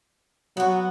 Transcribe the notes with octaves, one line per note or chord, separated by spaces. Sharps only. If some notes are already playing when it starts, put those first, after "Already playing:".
F#3 B3 F#4